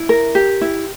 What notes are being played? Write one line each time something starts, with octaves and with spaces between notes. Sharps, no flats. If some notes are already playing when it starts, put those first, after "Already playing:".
Already playing: E4
A#4
G4
E4